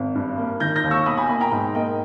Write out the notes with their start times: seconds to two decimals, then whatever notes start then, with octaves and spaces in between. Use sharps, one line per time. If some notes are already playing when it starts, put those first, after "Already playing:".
Already playing: G#1
0.15 G2
0.37 A#3
0.60 D#3 G6 A#6
0.76 G6 A#6
0.83 D#2
0.91 C#6 E6
1.06 B2 B5 D#6
1.17 G#5 B5
1.29 A#3 G#5 B5
1.40 G5 A#5
1.52 G#2
1.75 A#3 D#5 G5